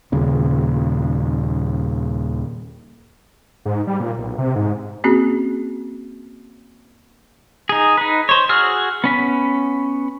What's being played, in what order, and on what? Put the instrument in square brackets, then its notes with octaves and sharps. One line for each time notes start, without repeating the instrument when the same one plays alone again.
[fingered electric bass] D#1 D#2 C#3
[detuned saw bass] G#2
G3
A#2
B1
C3
G#2
[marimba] A#3 C4 C#4 F#4 G#4
[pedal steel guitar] D#4 G#4
D#4 B4
C5 C#5
F#4 G#4 E6 F6
B3 C#4 B5